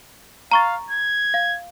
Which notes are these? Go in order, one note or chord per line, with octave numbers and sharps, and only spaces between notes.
F5 A#5 C#6 A6
G#6
F5